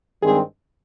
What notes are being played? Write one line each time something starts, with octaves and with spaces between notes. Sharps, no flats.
G2 D#3 G#3 C4 G#4